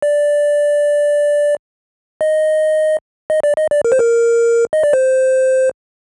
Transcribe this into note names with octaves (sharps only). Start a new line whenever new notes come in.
D5
D#5
D#5
D5
D#5
D5
A#4
C5
A#4
D#5
D5
C5